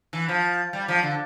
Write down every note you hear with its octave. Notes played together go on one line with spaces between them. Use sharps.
E3
F3
G3
F3
D3